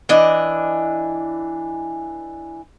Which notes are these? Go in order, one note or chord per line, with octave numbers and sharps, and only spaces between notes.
E3 D4 D#5